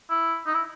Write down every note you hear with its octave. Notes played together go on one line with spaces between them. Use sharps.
E4
D#4
E4